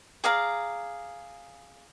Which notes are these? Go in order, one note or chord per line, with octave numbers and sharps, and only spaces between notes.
G#4 D5 F5 A#5